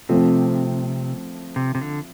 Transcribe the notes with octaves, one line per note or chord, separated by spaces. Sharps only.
C3 F3 A3 C4
C3
C3
D3